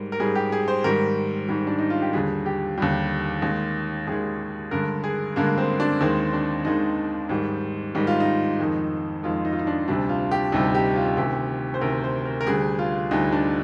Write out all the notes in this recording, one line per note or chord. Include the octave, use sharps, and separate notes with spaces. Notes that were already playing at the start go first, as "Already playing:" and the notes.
Already playing: G#2 G3 A#4
A#4
G#2 G3 G#4
G4
G#4
C5
G#2 D#3 G3 A#4
G#2 D#3 G3
D4
D#4
F4
G4
D#2 D3 G3 G#4
G4
D#2 D3 G3
D#2 D#3 G#3
D#2 D#3 G#3 G#4
G2 D3 G#3 A#4
G#4
G2 D3 G#3 A#3
C4
D4
D#2 D#3 G#3 C4
D4
D#2 D#3 G#3 D#4
G#2 D#3 G3
G#2 D#3 G3 D#4
F4
D#4
F2 D#3 G#3
F2 D#3 G#3 F4
D#4
F4
D#4
D4
D2 C3 G3 D4
F4
G4
D2 C3 G3 D#4
G4
F4
D2 C3 D#3 G4
C5
D2 C3 D#3 A#4
C5
A#4
A#4
D2 D3 G3 G#4
F4
D2 D3 G3 D#4
D4